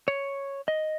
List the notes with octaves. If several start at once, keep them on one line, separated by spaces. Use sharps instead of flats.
C#5
D#5